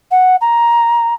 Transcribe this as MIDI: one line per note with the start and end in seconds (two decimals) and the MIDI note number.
0.11 0.36 78
0.41 1.14 82